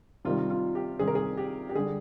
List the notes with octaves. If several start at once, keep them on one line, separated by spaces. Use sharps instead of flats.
C3 D#3 G3 F4
F4
G4
C3 D#3 G3 G#4
A#4
G#4
G4
G4
D3 G3 G#4